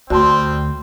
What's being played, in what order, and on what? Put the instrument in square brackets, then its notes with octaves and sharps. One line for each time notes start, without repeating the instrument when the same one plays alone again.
[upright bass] D2 [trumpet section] G3 C4 [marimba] F#4 [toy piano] D5 A5 C6